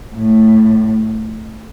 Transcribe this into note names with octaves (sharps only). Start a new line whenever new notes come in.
A2